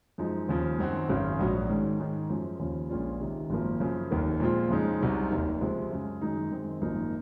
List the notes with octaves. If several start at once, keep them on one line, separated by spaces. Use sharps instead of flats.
F#2 F3 G#3 D#4
D#2 C#3 F3
F#2 D#3 F#3 C4 F#4
G#1 F#2 C#3
A#1 G#2 F#3 C#4 F#4
G#2 D#3 G#3 C#4
G#2 D#3 G#3
F#2 F3 G#3 C#4
D#2 C#3 F3
A#1 A#2 G#3 C#4 F4
C#2 C3 D#3
G#1 F#2 F3 A#3
F#2 C#3 F3
F1 D#2 D#3 A#3
A#2 F3 G#3 C4 F4
F2 C#3 F3 G#3 D#4
C2 C3 F#3 C4 D#4
F1 D#2 D#3
C#2 C3 F3 G#3 C4
F#2 C#3 G#3
F#2 D#3 G#3 D#4
F#2 D#3 G#3 C4
G#1 F#2 F3 A#3 D#4